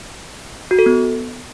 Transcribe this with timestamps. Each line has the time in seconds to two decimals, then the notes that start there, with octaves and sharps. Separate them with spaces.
0.71 F#4
0.79 A4
0.86 B3